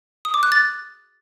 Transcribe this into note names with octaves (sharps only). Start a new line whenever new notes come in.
D#6
D6
F#6
A6